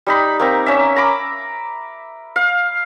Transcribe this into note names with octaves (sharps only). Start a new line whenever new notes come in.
G3 D#4 B5
A#3 C4 A#5
C#4 E5
A#5 B5 D6
F5